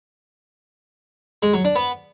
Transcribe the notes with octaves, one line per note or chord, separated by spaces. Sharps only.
G#3
F#3
D4
B3